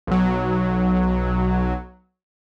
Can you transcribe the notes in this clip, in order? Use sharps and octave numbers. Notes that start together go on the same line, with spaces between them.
B1 F#3